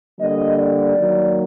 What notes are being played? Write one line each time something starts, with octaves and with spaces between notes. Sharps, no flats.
D3 G3 A#3 D#5
D5
D#3 F#3 A#3